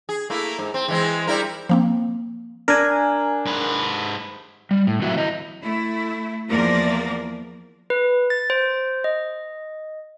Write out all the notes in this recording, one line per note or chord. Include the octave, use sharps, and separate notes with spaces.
G#4
A3 A#3 E4
G#2
C4
E3 G#3 C4
G3 E4 A#4
F3 A#3 C4
D4 A#4 G#5
G#2 B4
G3
A2
D#3 F#3 C4 E4 F#4 E5
E4 D#5
A3 E4
E2 F3 A#3 A#4 D5
B4
A6
C5
D#5